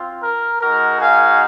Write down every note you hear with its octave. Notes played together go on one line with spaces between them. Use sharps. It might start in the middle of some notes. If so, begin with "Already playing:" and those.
Already playing: C4 F4
A#4
G#3 D#4 F#4 A#4
F5 G#5